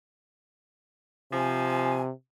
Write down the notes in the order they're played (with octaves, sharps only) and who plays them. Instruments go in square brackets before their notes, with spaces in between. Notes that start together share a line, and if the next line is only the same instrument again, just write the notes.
[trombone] C3 [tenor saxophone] F3 [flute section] G#5